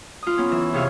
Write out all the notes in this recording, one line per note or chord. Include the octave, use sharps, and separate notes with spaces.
F4 D#6
B3 C#4
E3
F2 C3 G#4 C#5 F5